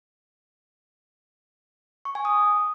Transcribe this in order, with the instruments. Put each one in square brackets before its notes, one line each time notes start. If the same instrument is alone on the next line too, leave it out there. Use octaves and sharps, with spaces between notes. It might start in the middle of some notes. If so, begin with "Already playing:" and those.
[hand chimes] C#6
G#5
D#6